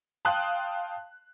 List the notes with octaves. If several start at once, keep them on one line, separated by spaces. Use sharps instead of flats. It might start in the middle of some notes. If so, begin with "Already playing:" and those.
F5 G5 A5 C6 D#6 F#6